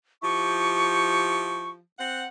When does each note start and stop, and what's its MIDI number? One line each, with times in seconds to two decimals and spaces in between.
0.22 1.76 53
0.22 1.76 64
0.22 1.76 67
0.22 1.70 85
1.99 2.24 60
1.99 2.24 78